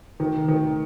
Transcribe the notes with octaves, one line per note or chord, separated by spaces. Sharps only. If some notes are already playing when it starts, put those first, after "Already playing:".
D#3
D#3